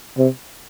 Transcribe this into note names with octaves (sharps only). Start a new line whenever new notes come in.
C3